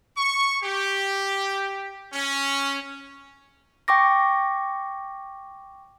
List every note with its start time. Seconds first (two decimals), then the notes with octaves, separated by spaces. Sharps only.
0.17 C#6
0.63 G4
2.13 C#4
3.88 G5 C#6 D6 A#6